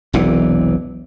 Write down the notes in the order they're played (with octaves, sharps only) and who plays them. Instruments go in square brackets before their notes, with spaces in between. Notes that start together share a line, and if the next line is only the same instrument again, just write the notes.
[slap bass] E1 B1 C3 E3